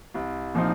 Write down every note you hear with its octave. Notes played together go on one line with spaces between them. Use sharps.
C2
A#2 F3 C4 D#4